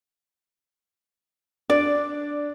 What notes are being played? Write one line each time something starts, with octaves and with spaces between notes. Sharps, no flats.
D4 D5